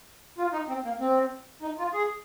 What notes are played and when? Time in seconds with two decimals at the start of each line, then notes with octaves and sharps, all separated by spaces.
0.38 F4
0.53 D#4
0.68 C4
0.84 A#3
1.00 C4
1.62 D#4
1.79 F4
1.93 G#4